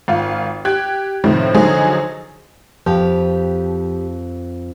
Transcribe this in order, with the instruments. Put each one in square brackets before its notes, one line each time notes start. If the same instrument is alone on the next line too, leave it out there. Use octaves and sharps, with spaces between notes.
[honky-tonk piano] G#1 F4
G4 F#6 G#6
A2 C3 D#3 F3
D3 F3 F#3 D#4 G#4
[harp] F2 [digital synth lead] F3 [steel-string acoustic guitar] G4 B4 F5